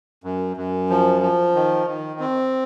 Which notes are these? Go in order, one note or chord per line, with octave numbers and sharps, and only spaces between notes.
F#2
F#2
F3
F3
D#3
D#3
C4